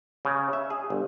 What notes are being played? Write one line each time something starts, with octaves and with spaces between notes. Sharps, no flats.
C#3
E5
G#4
G1